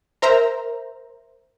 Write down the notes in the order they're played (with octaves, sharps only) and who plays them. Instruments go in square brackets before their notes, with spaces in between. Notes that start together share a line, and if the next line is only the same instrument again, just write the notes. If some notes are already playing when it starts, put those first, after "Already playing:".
[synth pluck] A#4 C5 E5 A#5